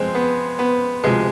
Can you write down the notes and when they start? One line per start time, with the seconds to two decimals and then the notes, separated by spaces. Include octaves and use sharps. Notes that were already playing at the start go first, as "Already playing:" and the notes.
Already playing: F2 G#3 C4
0.15 B3
0.59 B3
1.04 D2 C3 F3 G#3